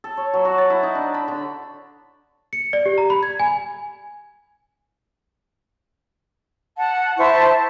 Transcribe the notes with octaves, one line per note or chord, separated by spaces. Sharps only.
A4
C#5
F#3
F#4
A5
E4
D#4
D4
B5
D3
C#7
D5
G4
A#5
B5
G#6
G#5
F#5 A5
E4 C5 A5 C#6